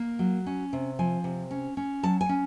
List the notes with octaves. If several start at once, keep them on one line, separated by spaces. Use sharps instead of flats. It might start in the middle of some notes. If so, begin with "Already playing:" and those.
Already playing: A#3
F#3
C#4
C3
F3 G#5
C3
C#4
C#4
F#3 A5
G#5
C#4